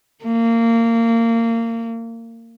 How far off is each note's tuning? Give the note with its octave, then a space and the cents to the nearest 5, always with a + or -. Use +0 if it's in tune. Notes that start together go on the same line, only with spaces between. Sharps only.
A#3 -25